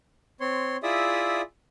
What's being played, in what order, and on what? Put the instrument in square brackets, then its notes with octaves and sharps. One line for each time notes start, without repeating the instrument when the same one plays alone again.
[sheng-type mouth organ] C4 C#5 C6
E4 F4 G#4 D5 E5 D#6